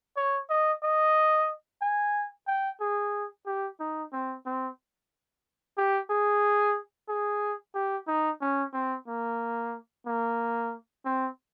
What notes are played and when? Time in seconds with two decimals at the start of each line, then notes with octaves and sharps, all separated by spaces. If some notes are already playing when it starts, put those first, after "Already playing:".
0.17 C#5
0.50 D#5
0.83 D#5
1.82 G#5
2.47 G5
2.81 G#4
3.46 G4
3.80 D#4
4.13 C4
4.46 C4
5.78 G4
6.10 G#4
7.09 G#4
7.75 G4
8.07 D#4
8.41 C#4
8.73 C4
9.08 A#3
10.06 A#3
11.05 C4